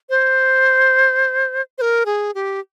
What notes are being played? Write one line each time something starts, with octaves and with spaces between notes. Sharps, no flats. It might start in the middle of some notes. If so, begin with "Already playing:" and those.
C5
C5
A#4
G#4
G4